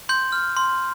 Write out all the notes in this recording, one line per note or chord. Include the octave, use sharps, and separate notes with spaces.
C6 G6
F6
C6